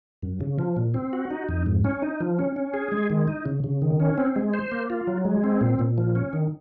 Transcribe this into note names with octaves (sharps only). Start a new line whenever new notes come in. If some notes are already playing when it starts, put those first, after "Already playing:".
F#2
C#3
F3
A#2
C4
F#4
D#4
F2
G#2
C#4
D#4
F3
C#4
C#4
G#4
G#3
D#3
D#4
C#3
C#3
D#3
C#4
C4
G#3
C5
A#3
F4
F#3
G#3
C4
A#2
A#2
F3
C#4
D#3